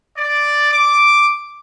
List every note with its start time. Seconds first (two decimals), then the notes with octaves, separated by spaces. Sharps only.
0.18 D5
0.71 D6